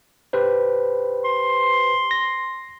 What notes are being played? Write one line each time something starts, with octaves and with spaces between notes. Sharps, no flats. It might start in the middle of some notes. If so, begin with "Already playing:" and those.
G4 B4 C5
C6
A#6